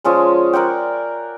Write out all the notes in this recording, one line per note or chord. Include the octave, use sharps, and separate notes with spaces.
F3 G#3 C#4 D5
A#4 D5 F#5 G5